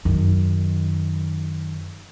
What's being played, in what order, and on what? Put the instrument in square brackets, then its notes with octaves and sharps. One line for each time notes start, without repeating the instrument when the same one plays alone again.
[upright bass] F#2 D#3